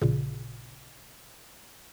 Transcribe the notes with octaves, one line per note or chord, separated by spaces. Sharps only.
A1 A#2 C#3